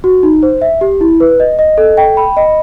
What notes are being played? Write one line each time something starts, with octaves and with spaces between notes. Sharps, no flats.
F#4
D#4
C5
E5
G4
E4
B4
D#5
D#5
A4
G5
B5
D#5